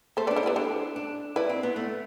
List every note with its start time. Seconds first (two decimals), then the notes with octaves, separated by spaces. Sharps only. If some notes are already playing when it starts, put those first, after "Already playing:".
0.17 A3 A4 C5
0.27 B4 D5
0.31 D4
0.36 A4 C5
0.43 E4 G4 B4
0.56 D4 A4 C5
0.96 D4
1.36 E4 B4 D5
1.49 C4
1.63 B3
1.76 A3